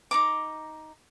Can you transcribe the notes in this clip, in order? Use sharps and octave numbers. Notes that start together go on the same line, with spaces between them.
D#4 A#5 D6